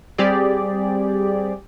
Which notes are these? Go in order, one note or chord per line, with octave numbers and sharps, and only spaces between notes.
G3 C4 G4 G#4 D5